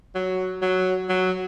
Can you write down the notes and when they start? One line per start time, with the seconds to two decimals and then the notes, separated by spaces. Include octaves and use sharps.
0.15 F#3
0.62 F#3
1.09 F#3